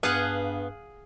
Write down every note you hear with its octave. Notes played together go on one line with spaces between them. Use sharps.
G2 B3 G#4 F5 F#5